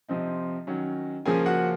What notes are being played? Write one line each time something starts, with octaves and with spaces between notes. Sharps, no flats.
C3 F3 C4 D#4
D#3 F#3 C#4
C#3 F3 A#3 C#4 G#4 G#5
F#4 F#5